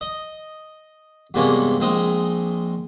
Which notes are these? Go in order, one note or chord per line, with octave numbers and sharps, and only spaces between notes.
D#5
E2 G2 C3 G#3 A#3 C#4
A#1 G#3 C4 D#6